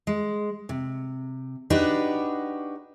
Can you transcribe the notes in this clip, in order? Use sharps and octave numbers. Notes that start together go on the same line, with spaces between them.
G#3
C3
D4 D#4 F#4 G4 B4